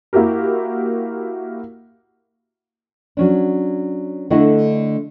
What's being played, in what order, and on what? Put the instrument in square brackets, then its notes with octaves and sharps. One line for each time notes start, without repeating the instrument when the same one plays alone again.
[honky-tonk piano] A#3 E4 F#4 G4 A#4
[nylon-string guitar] F#3 C#4 D4
D3 A3 D4 E4 D#5 F#5